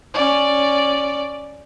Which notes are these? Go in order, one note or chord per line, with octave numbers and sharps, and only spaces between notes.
C#4 D5